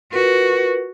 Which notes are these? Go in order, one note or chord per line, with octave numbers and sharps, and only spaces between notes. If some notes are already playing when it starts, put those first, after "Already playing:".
F4 F#4 A#4 B4